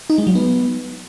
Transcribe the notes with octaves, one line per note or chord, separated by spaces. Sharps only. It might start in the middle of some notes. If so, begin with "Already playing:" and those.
D#4
G#3
F#3
B3